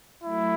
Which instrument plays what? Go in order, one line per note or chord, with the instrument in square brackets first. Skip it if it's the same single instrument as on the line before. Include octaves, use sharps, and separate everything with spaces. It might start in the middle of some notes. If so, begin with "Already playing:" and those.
[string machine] F#3 A3 [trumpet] E4